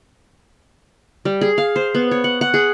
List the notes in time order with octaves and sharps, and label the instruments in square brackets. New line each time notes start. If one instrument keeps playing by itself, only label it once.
[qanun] G3
G#4
F5
C5
B3
C#5
F#5
F#5
G#4